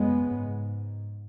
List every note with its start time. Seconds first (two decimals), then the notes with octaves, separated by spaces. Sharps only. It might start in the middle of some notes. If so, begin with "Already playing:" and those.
Already playing: F#2 C#3 G#3 B3
0.31 G#2